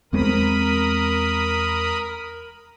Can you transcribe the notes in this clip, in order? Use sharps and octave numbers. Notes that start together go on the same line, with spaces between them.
E2 G#3 C4 A#4 B5 D#6